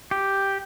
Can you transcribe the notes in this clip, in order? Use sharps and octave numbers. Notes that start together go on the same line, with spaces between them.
G4